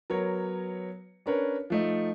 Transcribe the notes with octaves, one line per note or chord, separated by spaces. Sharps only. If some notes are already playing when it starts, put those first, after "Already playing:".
F#3 B3 A#4 C#5
C#4 D4 A#4 B4 C#5
F3 A3 D#4